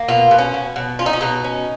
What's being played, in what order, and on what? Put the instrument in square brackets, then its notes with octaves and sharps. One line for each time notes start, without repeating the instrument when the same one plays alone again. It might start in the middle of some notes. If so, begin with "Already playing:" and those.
Already playing: [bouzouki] A#3
B2 F4
B2
C#4
B2
B2
C#4 F4
D#4
C#4
B2 D#4
C#4